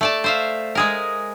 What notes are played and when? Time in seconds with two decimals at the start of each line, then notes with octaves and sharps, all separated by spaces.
0.01 A3 D5 A5
0.24 C5 E5 F5
0.75 G#3 G#4 A#4